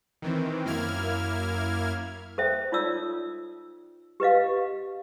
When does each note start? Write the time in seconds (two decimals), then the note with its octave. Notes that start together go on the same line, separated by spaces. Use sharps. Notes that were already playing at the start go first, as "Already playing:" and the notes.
0.22 D#3 E3 C4
0.65 F#2 A#3 E4 F6 G#6
2.38 A4 C5 E5 G5
2.72 D#4 F4 C#5 D5 D#6 E6
4.20 G4 B4 D#5 F5